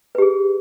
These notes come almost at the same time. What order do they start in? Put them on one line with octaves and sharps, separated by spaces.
B4 G4 G#4